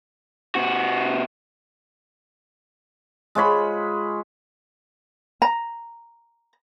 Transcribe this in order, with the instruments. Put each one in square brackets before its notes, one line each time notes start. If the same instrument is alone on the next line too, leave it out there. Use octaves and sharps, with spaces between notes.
[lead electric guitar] C3 F#4
[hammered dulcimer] G#3 F4 C#5 B5
[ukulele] A#5